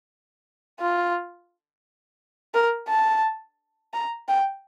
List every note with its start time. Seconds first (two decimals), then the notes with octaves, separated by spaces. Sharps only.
0.80 F4
2.54 A#4
2.89 A5
3.93 A#5
4.28 G5